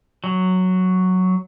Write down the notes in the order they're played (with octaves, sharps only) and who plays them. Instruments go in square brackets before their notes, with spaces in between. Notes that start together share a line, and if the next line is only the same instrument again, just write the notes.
[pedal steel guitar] F#3